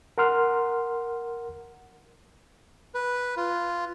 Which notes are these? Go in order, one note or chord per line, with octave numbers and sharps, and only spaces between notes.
A#4 F#5 C6 F6
B4
F4